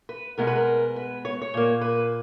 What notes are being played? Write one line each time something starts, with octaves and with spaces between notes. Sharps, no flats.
B4
B2 G#3 B3 A#4
B4
A#4
B4
C#5
C#5
A#2 A#3
B4